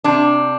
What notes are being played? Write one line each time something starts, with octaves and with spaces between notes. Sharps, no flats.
C3 D4